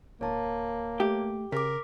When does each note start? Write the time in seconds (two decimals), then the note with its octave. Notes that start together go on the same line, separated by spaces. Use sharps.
0.21 D1 A#3 C#5 A5
1.00 A3 G4
1.52 C#3 A#4 D6 B6